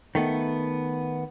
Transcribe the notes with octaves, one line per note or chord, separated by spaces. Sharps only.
D#3 A3 B3